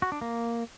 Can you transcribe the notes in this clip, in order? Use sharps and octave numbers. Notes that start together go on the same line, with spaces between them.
F#4
D4
A#3